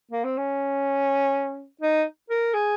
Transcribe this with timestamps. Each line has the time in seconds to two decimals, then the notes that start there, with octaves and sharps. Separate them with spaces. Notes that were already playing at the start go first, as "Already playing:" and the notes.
0.11 A#3
0.25 C4
0.37 C#4
1.82 D#4
2.30 A#4
2.54 G#4